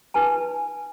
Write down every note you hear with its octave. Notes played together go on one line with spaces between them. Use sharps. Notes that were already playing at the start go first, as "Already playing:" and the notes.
D#4 B4 G#5 A5